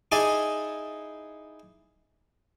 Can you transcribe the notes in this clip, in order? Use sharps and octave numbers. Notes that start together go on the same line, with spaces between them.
D#4 E4 G#4 D5 D#5 A5